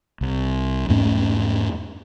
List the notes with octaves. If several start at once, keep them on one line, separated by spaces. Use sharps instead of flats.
C2
E2 G#2 A3 C#4